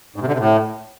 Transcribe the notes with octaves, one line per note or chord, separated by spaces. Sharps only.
G#2
C3
D3
C3
A2